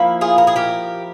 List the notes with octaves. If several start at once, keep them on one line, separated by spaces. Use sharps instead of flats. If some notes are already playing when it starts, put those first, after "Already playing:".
Already playing: F3 A#3 E4
F4 G#4
A#4
G#4
G4 A#4